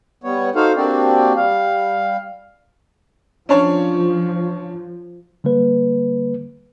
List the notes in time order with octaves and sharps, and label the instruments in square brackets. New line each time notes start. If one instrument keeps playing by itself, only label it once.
[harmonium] G3 B3 C#5
D#4 F#4 A4 C5 F5
A#3 C4 D4 F#4 G4 D5
G3 F5
[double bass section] F3 [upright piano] C#4 D4 C#5
[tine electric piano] D3 G3 A#3 B4